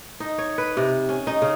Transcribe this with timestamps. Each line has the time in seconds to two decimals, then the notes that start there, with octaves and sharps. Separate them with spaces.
0.20 D#4
0.38 C#5
0.58 B4
0.77 C3
1.09 C#4
1.27 D#4
1.42 C#3